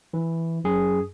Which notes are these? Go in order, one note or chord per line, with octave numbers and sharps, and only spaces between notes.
E3
F#2 G#4